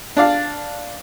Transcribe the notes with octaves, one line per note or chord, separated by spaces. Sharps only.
D4 D5 F5